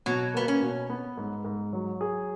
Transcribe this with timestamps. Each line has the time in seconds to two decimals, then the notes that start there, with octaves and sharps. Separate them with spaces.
0.06 B2 F#3
0.34 A#3 B3
0.48 C#4
0.62 B2
0.90 B3
1.18 G#2
1.45 G#2
1.73 F#3
2.01 G#4